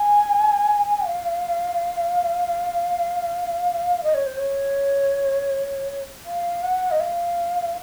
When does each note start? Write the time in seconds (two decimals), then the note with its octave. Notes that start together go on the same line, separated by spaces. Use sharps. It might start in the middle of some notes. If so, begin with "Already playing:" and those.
Already playing: G#5
1.07 F5
4.03 D#5
4.14 C#5
4.26 C5
4.37 C#5
6.26 F5
6.63 F#5
6.91 D#5
7.00 F5